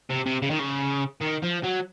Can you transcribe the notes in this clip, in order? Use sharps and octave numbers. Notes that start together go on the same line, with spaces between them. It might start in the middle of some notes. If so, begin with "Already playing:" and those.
C3
C3
C#3
D#3
C#3
D#3
F3
F#3